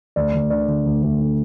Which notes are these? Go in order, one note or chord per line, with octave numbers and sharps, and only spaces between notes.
D2 D5
D2
D3 D5
D3
D2
D2
D3